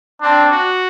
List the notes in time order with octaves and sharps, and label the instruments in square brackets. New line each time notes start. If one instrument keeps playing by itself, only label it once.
[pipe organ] C4 [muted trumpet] D4
[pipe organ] F#4